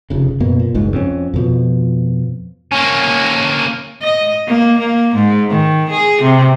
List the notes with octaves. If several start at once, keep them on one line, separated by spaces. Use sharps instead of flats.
F1 C#3
F#2 B2 A#3
A#2
F#1 C#2 G#2
F2 C#4
F2 B2 F3
A#3 C#4
D#5
A#3
A#3
G#2
D#3
G#4
C3